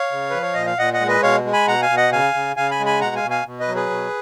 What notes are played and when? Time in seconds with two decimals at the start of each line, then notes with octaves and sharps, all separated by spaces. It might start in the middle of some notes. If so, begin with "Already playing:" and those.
Already playing: C#5 F5
0.12 C#3
0.30 F3 B4
0.42 C#5
0.54 A#2 D#5
0.66 F5
0.78 A#2 D#5 F#5
0.93 D#5 F#5
1.00 G#3
1.08 B4 D#5
1.23 B2 C#5 F5
1.45 G#3
1.53 G#5 B5
1.67 B2 F#5 A#5
1.82 F5 G#5
1.90 B2
1.97 D#5 F#5
2.12 C#3 F5 G#5
2.34 C#3
2.56 C#3 F5 G#5
2.71 G#5 B5
2.79 G#3
2.86 G#5 B5
3.01 B2 F#5 A#5
3.16 F5 G#5
3.23 B2
3.31 F5 G#5
3.46 B2
3.60 B4 D#5
3.68 F#3
3.75 G#4 B4
3.90 B2